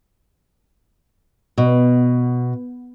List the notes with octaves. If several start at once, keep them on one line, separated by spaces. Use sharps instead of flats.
B2